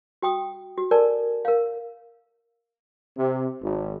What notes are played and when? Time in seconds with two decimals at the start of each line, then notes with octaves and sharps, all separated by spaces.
0.22 F#4 G5 D#6
0.77 F#4
0.91 A4 A#4 D5 G#5 A5
1.45 A#4 F5
3.17 C3
3.62 G#1